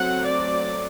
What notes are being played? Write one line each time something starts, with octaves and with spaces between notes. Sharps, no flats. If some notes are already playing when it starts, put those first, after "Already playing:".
Already playing: F#3 A3 C4 F#5
D5